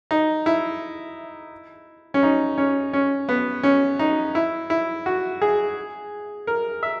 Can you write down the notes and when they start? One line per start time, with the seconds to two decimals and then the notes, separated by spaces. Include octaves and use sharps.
0.11 D#4
0.46 E4
2.14 C#4
2.23 D#4
2.58 C#4
2.93 C#4
3.29 B3
3.63 C#4
3.99 D#4
4.35 E4
4.70 E4
5.06 F#4
5.42 G#4
6.47 A#4
6.83 E5